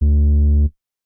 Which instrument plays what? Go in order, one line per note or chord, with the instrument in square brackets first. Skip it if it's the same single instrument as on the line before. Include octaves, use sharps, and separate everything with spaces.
[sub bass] D2